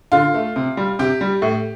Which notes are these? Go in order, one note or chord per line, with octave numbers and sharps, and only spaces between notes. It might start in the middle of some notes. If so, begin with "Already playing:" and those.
D3 F4
A3
C3
G3
C3 G4
G3
A2